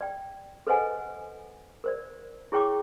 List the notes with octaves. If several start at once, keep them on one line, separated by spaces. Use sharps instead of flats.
D5 G5
A4 B4 C5 D#5 F#5 G#5
A#4 C5 D5
E4 G#4 C#5 G5 C#6 D6